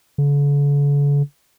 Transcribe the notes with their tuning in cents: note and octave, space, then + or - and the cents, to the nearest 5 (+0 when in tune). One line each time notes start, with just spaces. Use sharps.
D3 -45